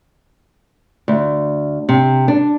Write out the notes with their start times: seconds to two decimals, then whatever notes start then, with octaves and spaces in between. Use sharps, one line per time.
1.08 D2
1.89 C3
2.28 D4